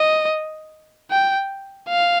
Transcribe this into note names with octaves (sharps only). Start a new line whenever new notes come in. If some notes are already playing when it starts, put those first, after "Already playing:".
Already playing: D#5
G5
F5